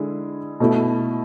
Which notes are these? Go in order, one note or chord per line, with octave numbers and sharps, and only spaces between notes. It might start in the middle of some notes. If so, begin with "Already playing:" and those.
Already playing: D3 G#3 E4 G#4
B2 A3 E4